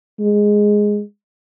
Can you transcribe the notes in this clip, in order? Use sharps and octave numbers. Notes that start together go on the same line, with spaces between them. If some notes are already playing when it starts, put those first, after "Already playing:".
G#3